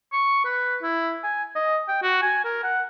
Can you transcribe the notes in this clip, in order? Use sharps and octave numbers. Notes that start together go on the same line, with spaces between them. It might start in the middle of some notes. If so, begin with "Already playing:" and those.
C#6
B4
E4
G#5
D#5
G5
F#4
G#5
A#4
F#5